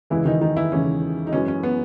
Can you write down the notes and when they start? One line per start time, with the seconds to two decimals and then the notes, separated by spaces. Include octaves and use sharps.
0.10 E2 C#3 E3 G#3 E4
0.25 D#3 D#4
0.41 D#3 D#4
0.56 E3 E4
0.72 E2 C#3 E3 G#3 C#4
1.27 D#4
1.33 F#2 E3 G#3 C#4
1.48 C#4
1.63 B3